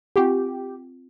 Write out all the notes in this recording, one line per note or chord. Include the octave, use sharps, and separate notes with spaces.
C4 F4 G4 F#5